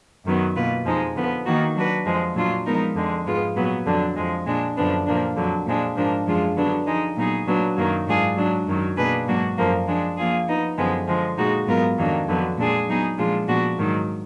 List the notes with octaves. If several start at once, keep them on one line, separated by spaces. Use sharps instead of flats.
F#2 D#3 F#3 B3
B2 A#3 F4 B4
F2 F3 G#3 D#4
D3 F3 B3
D#3 A#3 D#4 F#4
F#3 D4 F#4 B4
F2 F3 G#3
A#2 F#3 D4 F4
F3 G#3 B3 D#4 A#4
F2 D3 G#3
G#2 F3 G#3 B3 F4
A#2 F#3 B3
F2 D3 F#3 D4
F2 F3 G#3
A#2 G#3 D4
F#2 D3 F3 B3 D4
A#2 F3 A#3 D4
F2 D3 F#3
A#2 F3 G#3 D4
G#2 F3 A#3 D4
F#2 F3 G#3 D4 F4
D3 F#3 B3 D4
F3 G#3 D#4
A#2 F#3 B3 D#4 G#4
A#2 F#3 B3 D4
F#2 D#3 F#3 A#3
G#2 F#3 D4 F4 G#4
G#2 F#3 D4
F#2 D#3 F#3
B2 A#3 D4 G#4 B4
G#2 F#3 A#3 D4 F#4
F#2 D3 F3 A#3
F3 G#3 D4
F3 A#3 F4 G#4
F3 B3 D#4
F#2 D3 F3 G#3 B3
D3 F3 G#3
A#2 G#3 D#4 F#4
G#2 F#3 B3 F4 A#4
F2 D#3 F#3 A#3 D4
F2 D3 F#3 B3
A#2 G#3 D4 G#4
F#3 B3 D#4 G#4
A#2 F3 G#3 D4 F4
A#2 F3 B3 D4 F#4
G#2 D#3 F#3